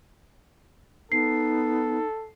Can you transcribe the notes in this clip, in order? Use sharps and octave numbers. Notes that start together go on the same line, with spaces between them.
B3 D#4 A4 C7